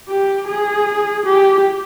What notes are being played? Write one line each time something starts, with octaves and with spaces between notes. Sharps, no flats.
G4
G#4
G4